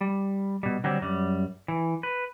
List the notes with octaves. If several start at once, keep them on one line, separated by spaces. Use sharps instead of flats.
G3
B2 G3
D3 F#3 G3 C4
F#2 G3
E3
B4